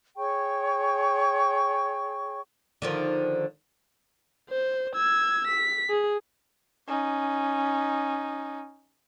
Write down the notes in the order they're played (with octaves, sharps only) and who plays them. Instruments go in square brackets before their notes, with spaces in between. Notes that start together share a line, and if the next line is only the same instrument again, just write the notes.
[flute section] G#4 C#5 G5 C#6
[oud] D3 D#3 F3
[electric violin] C5
E6 G#6
B6
G#4
[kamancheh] C#4 D#4